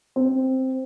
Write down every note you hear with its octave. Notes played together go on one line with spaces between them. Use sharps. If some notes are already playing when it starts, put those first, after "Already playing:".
C4